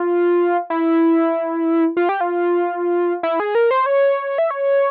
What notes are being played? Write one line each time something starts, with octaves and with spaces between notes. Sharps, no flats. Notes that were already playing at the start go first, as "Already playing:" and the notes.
Already playing: F4
E4
F4
G4
F4
E4
G#4
A#4
C5
C#5
E5
C#5